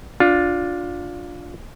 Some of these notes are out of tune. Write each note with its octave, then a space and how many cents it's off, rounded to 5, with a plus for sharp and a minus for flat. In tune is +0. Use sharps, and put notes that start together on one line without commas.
D4 -5 F4 +15